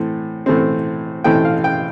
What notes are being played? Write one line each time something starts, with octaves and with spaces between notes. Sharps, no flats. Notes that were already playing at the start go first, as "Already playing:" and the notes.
Already playing: A2 E3 A3 C4
A2 E3 A3 C4
A2 E3 A3 C4 G5
F5
G5